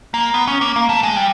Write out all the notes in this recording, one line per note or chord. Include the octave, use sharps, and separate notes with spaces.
A#3
B3
C#4
A#3
A#3
A3
G#3
G3